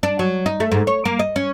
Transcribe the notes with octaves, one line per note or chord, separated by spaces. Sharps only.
D4
F#3
D#4
A3
G#2
C#5
A#3
D#5
C#4